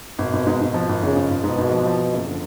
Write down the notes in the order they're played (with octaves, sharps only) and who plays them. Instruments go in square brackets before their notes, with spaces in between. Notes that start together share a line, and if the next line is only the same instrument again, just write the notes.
[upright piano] G#1 [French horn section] B2
[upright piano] G#1
G#2
G#2
F3
G#1
[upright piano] G#1 [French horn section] C#3
[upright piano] G#1
G#1
[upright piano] G#2 [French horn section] B2
[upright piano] G#1
F3
F3
F3
F#1
D3